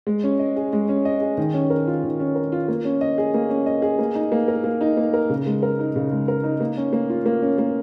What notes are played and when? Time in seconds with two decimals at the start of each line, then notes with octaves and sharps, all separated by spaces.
0.07 G#3
0.24 C#4
0.39 D#5
0.56 G#4
0.73 G#3
0.89 C#4
1.05 D#5
1.21 G#4
1.37 D#3
1.54 C#4
1.70 A#4
1.87 F4
2.04 D#3
2.20 C#4
2.35 A#4
2.52 F4
2.68 A#3
2.85 C#4
3.01 D#5
3.18 G#4
3.34 A#3
3.50 C#4
3.66 D#5
3.82 G#4
3.99 A#3
4.15 D#4
4.32 A#3
4.48 A#4
4.64 A#3
4.81 D#4
4.97 A#3
5.13 A#4
5.29 C#3
5.46 G#3
5.62 A#4
5.79 D#4
5.96 C#3
6.12 G#3
6.28 A#4
6.44 D#4
6.60 A#3
6.77 C#4
6.93 A#3
7.10 F4
7.26 A#3
7.42 C#4
7.58 A#3